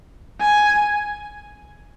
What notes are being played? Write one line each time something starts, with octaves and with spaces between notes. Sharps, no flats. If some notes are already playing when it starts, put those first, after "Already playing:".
G#5